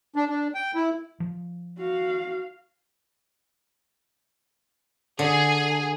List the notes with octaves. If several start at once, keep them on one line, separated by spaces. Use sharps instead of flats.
D4
D4
G5
E4
F3
F#4 F5
D3 G#4